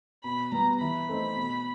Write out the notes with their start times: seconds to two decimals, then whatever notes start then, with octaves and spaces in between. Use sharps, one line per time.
0.24 B2 B5
0.52 G3 B3 A#5
0.81 E3 B5
1.09 A3 C4 D#4
1.36 B2